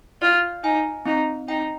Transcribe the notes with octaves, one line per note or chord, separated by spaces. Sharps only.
F4 D5
D#4 G#5
C4 D#4
D#4 G5